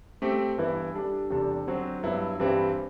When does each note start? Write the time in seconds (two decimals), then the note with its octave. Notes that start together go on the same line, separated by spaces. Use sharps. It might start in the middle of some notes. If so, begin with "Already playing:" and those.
0.22 A3 C4 G4
0.57 G2 E3 B3 E4
0.94 G3 D4 A4
1.30 E2 C3 G3 D4 A4
1.67 D3 F#3 C4 F#4 C5
2.03 G2 F#3 B3 E4
2.39 G2 E3 G3 C4 E4